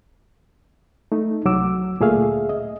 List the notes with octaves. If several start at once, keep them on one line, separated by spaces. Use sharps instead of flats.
A3 D#4
C2 F#3 F#4 D6 E6
D2 A#2 A3 G#4 E5 F5
D#5